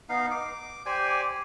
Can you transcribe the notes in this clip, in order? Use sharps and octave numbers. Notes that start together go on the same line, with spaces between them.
B3 D#4 F5
D6
G4 C5 D5 G#5